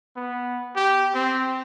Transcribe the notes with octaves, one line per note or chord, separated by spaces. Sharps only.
B3
G4
C4